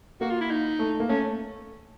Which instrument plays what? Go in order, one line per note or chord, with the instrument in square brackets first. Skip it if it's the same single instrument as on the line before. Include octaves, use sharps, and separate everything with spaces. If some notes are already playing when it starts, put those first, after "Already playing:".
[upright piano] A#3 [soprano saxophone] F#4
[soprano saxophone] F4
E4
D#4
[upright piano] A3
A#3
[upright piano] A3 [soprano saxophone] C#4